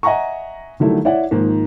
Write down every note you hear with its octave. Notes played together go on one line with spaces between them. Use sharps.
D#5 E5 F#5 G#5 A#5 C#6
D3 D#3 F#3 G3 A3 E4
E4 C#5 D5 E5 F#5
G#2 D#3 F3 A#3